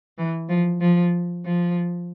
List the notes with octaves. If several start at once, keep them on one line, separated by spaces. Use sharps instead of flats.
E3
F3
F3
F3